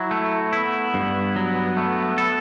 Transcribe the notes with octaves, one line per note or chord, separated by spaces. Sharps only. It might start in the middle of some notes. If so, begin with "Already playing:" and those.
Already playing: F#3 E4
A3
B3 E4
G2
F#3
A3
A4